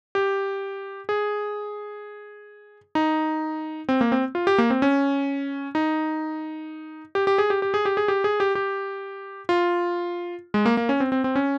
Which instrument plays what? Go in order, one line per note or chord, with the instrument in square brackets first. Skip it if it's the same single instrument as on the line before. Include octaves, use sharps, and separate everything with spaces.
[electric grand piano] G4
G#4
D#4
C4
A#3
C4
F4
G4
A#3
C4
C#4
D#4
G4
G4
G#4
G4
G4
G#4
G4
G#4
G4
G#4
G4
G4
F4
G#3
A#3
A#3
C#4
C4
C4
C4
C#4